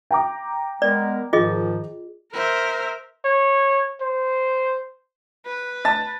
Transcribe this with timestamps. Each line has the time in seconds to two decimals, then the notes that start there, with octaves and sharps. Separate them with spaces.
0.11 G5 A#5 D6
0.82 G#3 B3 A#4 D5
1.33 G#2 D#3 F3 F4 G#4 D#5
2.33 A#4 C5 E5
3.25 C#5
4.01 C5
5.46 B4
5.85 A5 A6